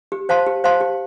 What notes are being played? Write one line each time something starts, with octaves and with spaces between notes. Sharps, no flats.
G4
C5 F5 A5 C6
G4
C5 F5 A5 C6
G4